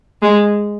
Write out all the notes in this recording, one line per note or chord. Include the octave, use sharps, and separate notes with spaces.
G#3